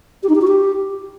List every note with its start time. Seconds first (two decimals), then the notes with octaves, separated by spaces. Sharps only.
0.23 G4
0.29 D#4
0.35 G4
0.41 F#4
0.47 G4